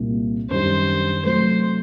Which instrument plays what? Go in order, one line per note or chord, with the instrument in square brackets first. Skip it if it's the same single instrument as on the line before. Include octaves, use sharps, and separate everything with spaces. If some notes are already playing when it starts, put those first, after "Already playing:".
Already playing: [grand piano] C2 A#2 G3 A#3
[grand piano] F#2 D#3 G3 D4 [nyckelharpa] C5
[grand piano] C3 F#3 A3 [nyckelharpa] C5